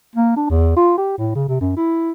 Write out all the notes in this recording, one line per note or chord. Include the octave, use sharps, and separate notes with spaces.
A#3
D4
E2
F4
G4
A2
C#3
C3
F#2
E4